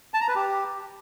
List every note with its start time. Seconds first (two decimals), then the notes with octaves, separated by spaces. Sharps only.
0.14 A5
0.21 A#5
0.28 B4
0.35 G4